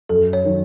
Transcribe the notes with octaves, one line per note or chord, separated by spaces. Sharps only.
F#2 A4
C#5
D#3 F#3